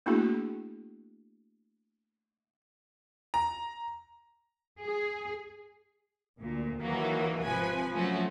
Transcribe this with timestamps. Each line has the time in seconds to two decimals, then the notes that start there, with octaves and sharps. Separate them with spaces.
0.06 A3 A#3 D4 E4 F#4 G#4
3.34 A#5
4.81 G#4
6.39 D2 A#2
6.80 D#2 D#3 E3 F#3 A#3
7.43 G#1 C3 F3 B4 G#5
7.93 F3 F#3 A3 C#4 F#4